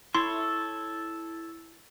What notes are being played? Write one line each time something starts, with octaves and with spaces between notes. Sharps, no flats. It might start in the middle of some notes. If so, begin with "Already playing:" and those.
E4 A4 C#5 C6